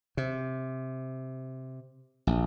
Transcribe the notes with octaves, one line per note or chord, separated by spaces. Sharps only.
C3
A#1